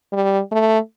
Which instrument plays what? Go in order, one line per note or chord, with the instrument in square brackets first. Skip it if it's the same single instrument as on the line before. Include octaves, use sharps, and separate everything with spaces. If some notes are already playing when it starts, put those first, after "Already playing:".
[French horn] G3
A3